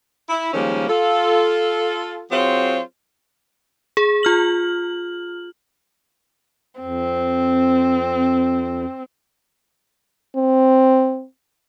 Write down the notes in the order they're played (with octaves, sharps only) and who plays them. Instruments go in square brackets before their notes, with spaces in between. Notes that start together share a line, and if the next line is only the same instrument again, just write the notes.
[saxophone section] E4
D#3 F3 G3 G#3 A#3 C#4
F4 A4
F#3 C4 F4 G#4 C5 C#5
[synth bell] G#4
F4 F6 F#7
[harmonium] F2 [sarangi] C4
[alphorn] C4